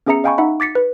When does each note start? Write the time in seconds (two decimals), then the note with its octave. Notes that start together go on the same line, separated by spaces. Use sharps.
0.06 B3 C#4 G#4 E5 A#5 C#7
0.24 D#5 F5 G5 G#5 B5 C#6
0.38 D#4 E5 F#5 B5
0.60 D6 A6 B6 C#7
0.75 B4